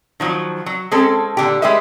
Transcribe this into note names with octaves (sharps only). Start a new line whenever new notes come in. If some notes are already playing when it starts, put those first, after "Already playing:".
D#3 F3 F#3
F#3
G#3 C4 C#4 A4
A#2 D3 G4
G#3 G4 B4 D#5 E5